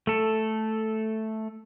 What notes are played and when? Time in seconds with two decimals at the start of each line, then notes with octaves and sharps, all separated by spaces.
0.07 A3 A4